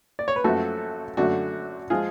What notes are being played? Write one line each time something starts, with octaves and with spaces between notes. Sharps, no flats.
D5
C#5
B4
F#2 F3 A3 F#4 A4
F#2 D3 F#3 A3 D4 F#4
F3 G#3 F4 G#4